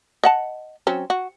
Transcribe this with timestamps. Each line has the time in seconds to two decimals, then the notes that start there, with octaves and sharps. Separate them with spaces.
0.24 D#5 F#5 A5
0.87 F#3 C4 C#4
1.10 F#4